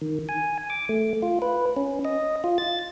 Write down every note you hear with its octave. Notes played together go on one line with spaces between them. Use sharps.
D#3
G#5
D6
A3
F4
B4
C#4
D#5
F4
A6